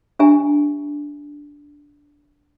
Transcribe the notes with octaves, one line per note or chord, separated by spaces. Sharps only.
D4 G4 E5 G#5 A#5